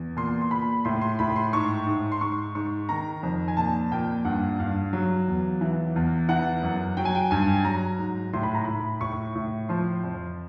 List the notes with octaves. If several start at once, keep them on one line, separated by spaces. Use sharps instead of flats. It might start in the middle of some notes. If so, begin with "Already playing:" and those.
Already playing: E2
A#2 C6
C6
A#2 B5
A2 C6
C6
A2 B5
C6
G#2 C#6
G#2
C6
G#2 C#6
G#2 C#6
D#3 A#5
F2
G#5
A#2 A5
A#2 G5
G2 F#5
G2 F5
F#3
E2
E3
E2
E3 F#5
F#2
F#3 G5
G#5
G5
G2 G#5
F#3 A#5
G#2
A2 C6
B5
A#5
A2 B5
A2 C#6
A2
F3 C6
F2